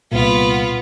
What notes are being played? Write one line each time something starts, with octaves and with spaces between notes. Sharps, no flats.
C2 A#2 B3 F4